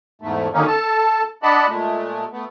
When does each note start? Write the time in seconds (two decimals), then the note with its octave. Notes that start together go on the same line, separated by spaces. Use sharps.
0.21 E2 G#2 A3
0.53 F#2 D3 D#3 A#3 C#4 D#4
0.67 A4 A5
1.43 D4 D5 D#5 F#5 A5 B5
1.68 A#2 G#3 A3
2.32 A3 B3